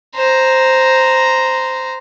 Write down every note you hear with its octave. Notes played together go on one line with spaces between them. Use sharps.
C5 A#5